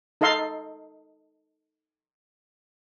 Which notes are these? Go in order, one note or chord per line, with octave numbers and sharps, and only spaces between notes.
D#4 A4 D#5 F5 C6